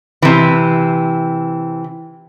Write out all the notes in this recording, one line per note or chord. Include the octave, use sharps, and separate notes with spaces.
C3 E3